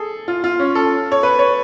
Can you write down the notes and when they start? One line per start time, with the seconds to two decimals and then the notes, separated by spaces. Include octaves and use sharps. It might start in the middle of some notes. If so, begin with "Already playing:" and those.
Already playing: G#4 A4
0.28 F4
0.44 F4
0.59 C#4
0.75 A4
1.12 C#5
1.23 B4
1.39 C#5